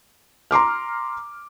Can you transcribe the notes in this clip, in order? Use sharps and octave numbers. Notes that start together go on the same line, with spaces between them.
A#5 C6 D6 F6